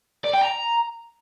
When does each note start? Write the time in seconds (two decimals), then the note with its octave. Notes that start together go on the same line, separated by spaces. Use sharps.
0.24 D5
0.33 G5
0.42 A#5